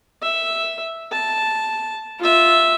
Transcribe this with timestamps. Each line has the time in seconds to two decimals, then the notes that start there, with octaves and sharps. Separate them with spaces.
0.22 E5
1.12 A5
2.19 F4 E5